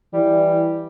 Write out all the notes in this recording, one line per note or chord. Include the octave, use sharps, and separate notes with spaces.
E3 G3